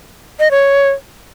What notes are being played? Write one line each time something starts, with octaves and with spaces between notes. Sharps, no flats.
D#5
C#5